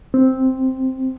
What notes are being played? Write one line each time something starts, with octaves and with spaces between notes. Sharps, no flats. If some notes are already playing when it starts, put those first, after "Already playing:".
C4